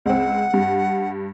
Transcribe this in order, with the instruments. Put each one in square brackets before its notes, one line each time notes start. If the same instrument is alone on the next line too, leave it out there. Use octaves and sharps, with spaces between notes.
[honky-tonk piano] C#2 C4 [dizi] F#5
[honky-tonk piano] G2